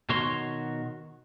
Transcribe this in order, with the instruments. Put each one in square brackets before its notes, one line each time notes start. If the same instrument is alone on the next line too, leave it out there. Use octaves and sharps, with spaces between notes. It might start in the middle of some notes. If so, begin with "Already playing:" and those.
[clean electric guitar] B2 D#3 F#4 C5 C#5 C6